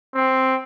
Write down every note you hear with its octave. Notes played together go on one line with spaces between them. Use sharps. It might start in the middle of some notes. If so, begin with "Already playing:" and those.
C4